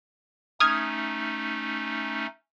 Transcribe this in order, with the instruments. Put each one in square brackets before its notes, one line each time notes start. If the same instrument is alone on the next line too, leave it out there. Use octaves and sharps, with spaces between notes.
[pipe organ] A3 C#4 D#4 [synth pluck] D#6 F6 G#6